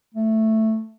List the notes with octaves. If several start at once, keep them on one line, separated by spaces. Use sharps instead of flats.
A3